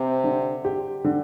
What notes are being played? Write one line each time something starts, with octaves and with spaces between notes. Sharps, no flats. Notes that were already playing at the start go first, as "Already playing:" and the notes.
Already playing: C3 C4
D3
G4
D3